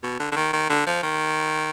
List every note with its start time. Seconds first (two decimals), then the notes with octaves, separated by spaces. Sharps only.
0.03 B2
0.20 D3
0.32 D3
0.36 D#3
0.53 D#3
0.70 D3
0.87 F3
1.03 D#3